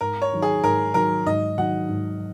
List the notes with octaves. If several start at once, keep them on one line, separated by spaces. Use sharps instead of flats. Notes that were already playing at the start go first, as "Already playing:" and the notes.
G#2 A#4
C#5
D#3 F#3 D#4
G#4
G#2 A#4
D#3 F#3 D#4 A#4
G#2 D#5
D#3 F#3 D#4 F#5
G#2